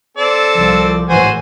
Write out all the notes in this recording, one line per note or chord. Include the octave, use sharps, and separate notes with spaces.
C4 A4 D5
C2 F3
G#1 A2 E3 F#4 C5 G#5